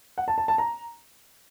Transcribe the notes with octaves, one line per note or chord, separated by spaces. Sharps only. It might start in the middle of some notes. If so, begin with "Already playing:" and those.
F#5
A5
A5
A5
A#5